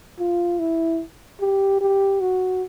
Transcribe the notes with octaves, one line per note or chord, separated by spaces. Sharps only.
F4
E4
G4
G4
F#4